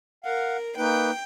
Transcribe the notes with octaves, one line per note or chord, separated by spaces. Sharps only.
A#4 F5 F#5
A#3 D#4 B4 G5